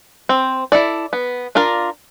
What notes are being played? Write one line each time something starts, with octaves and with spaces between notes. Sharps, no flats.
C4
E4 A4 D5
B3
D4 F4 A#4 D5